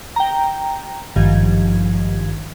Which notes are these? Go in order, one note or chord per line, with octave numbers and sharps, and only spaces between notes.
G5 A#5
G#1 G2 D#3 F3 G#6